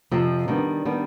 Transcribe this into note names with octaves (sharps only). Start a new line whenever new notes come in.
F2 C3 F3
D#3 G3 B3 D4
D#3 G3 B3 D4